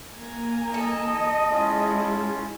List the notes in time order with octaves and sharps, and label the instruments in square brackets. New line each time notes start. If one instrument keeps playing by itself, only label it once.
[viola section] A#3 G#5 A#5
[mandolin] A4 [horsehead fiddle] D#5
[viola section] G#3 E4 [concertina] C#4 F4